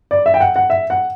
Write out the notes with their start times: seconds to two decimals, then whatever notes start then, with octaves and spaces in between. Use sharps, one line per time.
0.11 D5
0.26 E5
0.34 G5
0.41 F#5
0.56 F#5
0.70 E5
0.90 F#5